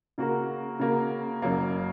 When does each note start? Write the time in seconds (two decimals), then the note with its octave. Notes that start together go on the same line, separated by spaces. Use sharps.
0.18 C#3 A#3 F#4 A#4
0.79 C#3 A#3 F#4 A#4
1.42 F#1 F#2 F#3 A#3